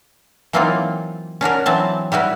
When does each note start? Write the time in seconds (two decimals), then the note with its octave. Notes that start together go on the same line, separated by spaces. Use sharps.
0.53 E3 F#3 A#3 C4 D#4 F4
1.41 C#4 D4 F#4 A#4
1.66 E3 F#3 C4 A5
2.12 G3 E4 F#4 B4